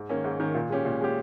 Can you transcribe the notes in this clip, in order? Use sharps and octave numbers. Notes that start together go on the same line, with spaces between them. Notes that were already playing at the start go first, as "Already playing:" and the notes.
Already playing: G#2
D#3 A#3 C#4
G#2
D#3 A#3 C#4
A#2
G#3 C#4 G4
A#2
G#3 C#4 G4